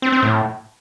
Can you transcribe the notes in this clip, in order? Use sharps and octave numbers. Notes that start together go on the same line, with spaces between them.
C4
C4
A2